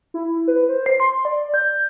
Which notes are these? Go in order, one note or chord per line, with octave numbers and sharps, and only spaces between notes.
E4
B4
C5
C7
C6
D5
G6